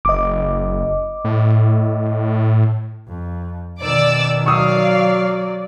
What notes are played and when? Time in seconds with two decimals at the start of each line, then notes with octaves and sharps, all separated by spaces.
0.05 F#1 D#5 D6
1.25 A2
3.08 F2
3.81 B2 D#3 D5 D6 E6
4.46 F#3 D5 F5 C#6 D#6 E6